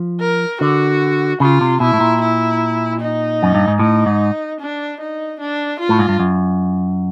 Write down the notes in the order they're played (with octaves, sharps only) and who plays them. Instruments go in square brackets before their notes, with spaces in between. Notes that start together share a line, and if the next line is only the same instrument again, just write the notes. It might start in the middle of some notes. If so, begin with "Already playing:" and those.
Already playing: [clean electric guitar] F3
[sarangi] A#4
[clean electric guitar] D3 [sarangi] F#4
[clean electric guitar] C#3 [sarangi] F4
[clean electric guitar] C3
[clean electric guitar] B2 [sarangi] E4
[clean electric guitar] A2
A#2
[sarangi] E4
D#4
[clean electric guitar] F#2
G2
G#2
[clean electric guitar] A2 [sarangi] D#4
[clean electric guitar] G#2
[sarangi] D4
D#4
D4
F4
[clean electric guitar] A2
G#2
G2
F#2